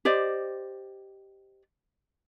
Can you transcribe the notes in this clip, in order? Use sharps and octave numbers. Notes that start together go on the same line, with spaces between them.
G4 C5 D5 D#5